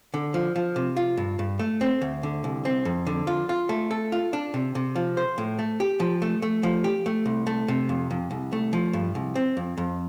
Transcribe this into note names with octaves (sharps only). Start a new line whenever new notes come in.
D3
F3
F3
C3
F4
G2
G2
A3
C4
D2
D3
C2
C4
F2
D3
F4
F4
A3
A4
F4
D4
C3
C3
F3
C5
A2
A3
G4
F3
A3
A3
F3
G4
A3
C2
A3
C3
F2
F2
C2
A3
F3
G2
C2
C4
F2
F2